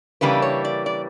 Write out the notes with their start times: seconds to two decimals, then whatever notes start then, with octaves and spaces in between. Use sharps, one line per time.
0.21 C#3 E3 G3 A#3 D4 B4
0.42 C#5
0.65 D5
0.86 D5